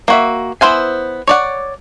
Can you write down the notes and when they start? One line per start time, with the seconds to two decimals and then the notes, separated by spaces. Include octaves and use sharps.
0.08 A#3 F#4 E5
0.61 B3 E4 C5 F5 G#5
1.27 C#5 D5 F#5